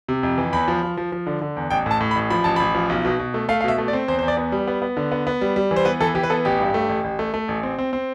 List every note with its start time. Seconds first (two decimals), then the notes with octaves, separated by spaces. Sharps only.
0.08 C3
0.23 F2
0.38 E3
0.53 E2 B5
0.68 F3
0.83 F3
0.97 F3
1.12 F3
1.27 D3
1.41 D3
1.56 E2
1.71 A1 G5
1.86 A2 A5
2.01 A2
2.11 B5
2.15 A1
2.30 F3 B5
2.44 A1 A5
2.56 A1 B5
2.75 F3
2.89 B1
3.05 B2
3.19 B2
3.34 A3
3.49 A3 F5
3.61 F5
3.64 B2 E5
3.78 A3
3.88 D5
3.93 C4
4.08 E2 C5
4.19 C5
4.23 E2
4.28 D5
4.37 B3
4.52 G3
4.67 B3
4.82 B3
4.97 D3
5.12 B3
5.27 B3
5.41 G3
5.56 G3
5.71 E3
5.76 C5
5.85 B3 B4
6.00 E3 A4
6.15 E3 G4
6.23 B4
6.30 B3 A4
6.45 A1 G4
6.60 G2
6.74 A3
6.89 A1
7.04 A1
7.19 A3
7.34 A3
7.48 A1
7.63 C4
7.78 C4
7.93 C4